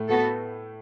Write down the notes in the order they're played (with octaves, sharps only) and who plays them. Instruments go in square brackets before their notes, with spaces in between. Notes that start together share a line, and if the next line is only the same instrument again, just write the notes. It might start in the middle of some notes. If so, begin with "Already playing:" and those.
Already playing: [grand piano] A2 A3
[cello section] B3 F#4 A4